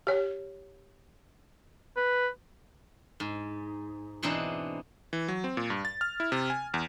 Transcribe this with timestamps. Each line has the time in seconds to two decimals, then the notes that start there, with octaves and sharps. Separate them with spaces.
0.07 G4 C#5
1.96 B4
3.20 G#2
4.23 B2 E3 C4 D4 D#4
5.13 E3
5.28 F#3
5.44 C4
5.57 A#2
5.70 G2
5.85 A6
6.01 F6
6.20 E4
6.32 C3
6.50 G#5
6.74 E2